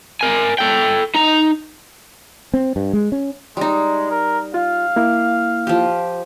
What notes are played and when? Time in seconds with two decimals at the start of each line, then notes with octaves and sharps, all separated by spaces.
0.21 A#4 G#5
0.58 A4 G5
1.15 D#4 A#5
2.54 C4
2.76 G2
2.93 G#3
3.12 C#4
3.57 G3 G#3 D#4
4.11 A#4
4.54 F4 F5
4.96 A#3 E4
5.67 F3 G4